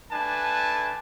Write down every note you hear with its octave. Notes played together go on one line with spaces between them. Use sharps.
A3 D4 B4 G#5 A5